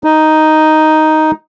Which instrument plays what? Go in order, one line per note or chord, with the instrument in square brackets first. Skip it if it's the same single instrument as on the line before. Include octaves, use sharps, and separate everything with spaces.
[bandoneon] D#4